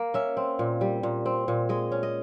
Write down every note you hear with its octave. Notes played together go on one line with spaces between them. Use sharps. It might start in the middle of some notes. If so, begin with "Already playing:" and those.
Already playing: A#3
C#4 E5
C4
A#2
G3
A#2
C4
A#2
G#3 D#5
C#4
D#5